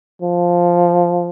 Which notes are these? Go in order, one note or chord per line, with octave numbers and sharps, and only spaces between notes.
F3